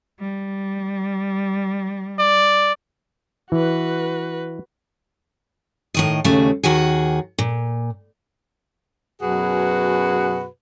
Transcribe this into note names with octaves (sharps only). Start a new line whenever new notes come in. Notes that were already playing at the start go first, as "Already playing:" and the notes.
G3
D5
E3 F#4 B4
A2 D#3 D#5
D#2 C#3 G3 A3
D#2 D#3 F#4 G#4
A#2
F#2 B2 F#4 G#4 B4